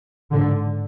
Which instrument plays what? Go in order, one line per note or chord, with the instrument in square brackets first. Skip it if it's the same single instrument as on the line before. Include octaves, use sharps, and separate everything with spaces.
[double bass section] G#2 D3